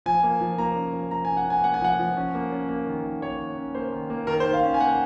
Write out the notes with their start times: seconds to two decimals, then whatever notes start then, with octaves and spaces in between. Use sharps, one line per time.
0.06 F3 G#5
0.23 A#3
0.41 F3
0.58 A#3 A#5
0.76 C#4
0.93 F3
1.11 F3 A#5
1.25 G#5
1.29 C#4
1.37 F#5
1.46 C#4 G#5
1.64 A#3 F#5
1.74 G#5
1.81 F3 F#5
1.99 F3
2.17 C#4
2.34 A#3
2.52 C#4
2.69 A#3
2.87 D#3
3.04 D#3
3.21 A#3 C#5
3.39 D#3
3.57 C#4
3.75 A#3 C5
3.93 D#3
4.10 A#3
4.27 D#3 A#4
4.40 C5
4.44 D#3
4.53 F5
4.63 C#4
4.74 G#5
4.80 A#3 F#5